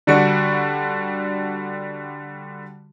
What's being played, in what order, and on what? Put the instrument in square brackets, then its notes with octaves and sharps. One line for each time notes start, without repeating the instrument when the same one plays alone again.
[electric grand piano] D3 G3 D4 F#4 C#7